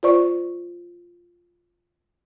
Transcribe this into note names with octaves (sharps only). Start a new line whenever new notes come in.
F4 C5 D5 C#6